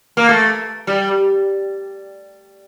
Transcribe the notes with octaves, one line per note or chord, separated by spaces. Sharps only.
A#3
A3
G3